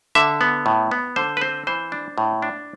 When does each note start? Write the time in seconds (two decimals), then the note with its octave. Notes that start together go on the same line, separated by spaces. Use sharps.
0.15 D3 E5
0.41 B3
0.66 A2
0.91 B3
1.16 D3 C5
1.37 B4
1.41 C4 C5
1.67 E3 C5
1.92 D4
2.18 A2
2.42 D4